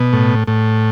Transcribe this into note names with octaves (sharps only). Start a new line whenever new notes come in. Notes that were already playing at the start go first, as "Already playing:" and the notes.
Already playing: B2
A2
A2